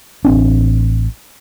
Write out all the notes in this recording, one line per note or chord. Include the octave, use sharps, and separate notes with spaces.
A1 C4 D4